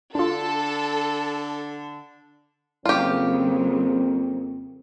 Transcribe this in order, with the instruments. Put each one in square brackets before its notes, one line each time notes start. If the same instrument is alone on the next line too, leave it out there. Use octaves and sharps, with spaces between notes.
[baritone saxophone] D3 [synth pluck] D4 F4 [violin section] A4
[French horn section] F2 A#3 C4 [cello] C#3 F#3 [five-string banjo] F4 G4